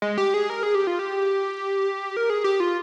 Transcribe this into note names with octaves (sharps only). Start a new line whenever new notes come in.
G#3
G4
G#4
A#4
G#4
G4
F4
G4
A#4
G#4
G4
F4